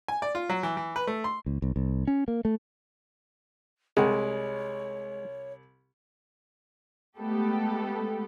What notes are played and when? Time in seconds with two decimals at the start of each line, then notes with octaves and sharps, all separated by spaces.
0.08 G#5
0.22 D5
0.35 F4
0.49 F#3
0.63 E3
0.77 E3
0.96 B4
1.07 A3
1.24 C6
1.46 C#2
1.62 C2
1.76 C2
2.07 C#4
2.28 A#3
2.45 A3
3.97 C2 C3 G#3 G#4 C#5 F#5 G5
7.18 G#3 A3 B3 G4 A4